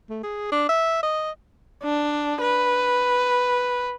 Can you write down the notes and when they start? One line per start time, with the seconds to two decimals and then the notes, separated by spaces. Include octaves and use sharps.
0.10 A3
0.23 G#4
0.51 D4
0.69 E5
1.03 D#5
1.82 D4
2.41 B4